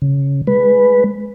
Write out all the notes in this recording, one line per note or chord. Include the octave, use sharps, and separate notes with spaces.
C#3
G#3 B4